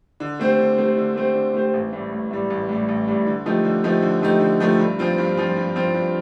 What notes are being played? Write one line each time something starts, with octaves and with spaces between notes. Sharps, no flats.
D3
A3 C4 G4 C5
D3
A3 C4 G4 C5
D3
A3 C4 G4 C5
D3
A3 C4 G4 C5
A1
A2 G3
A1
A2 G3
A1
A2 G3
A1
A2 G3
D3
F3 A3 D#4 G4
D3
F3 A3 D#4 G4
D3
F3 A3 D#4 G4
D3
F3 A3 D#4 G4
G2
F3 C4 F4
G2
F3 C4 F4
G2
F3 C4 F4
G2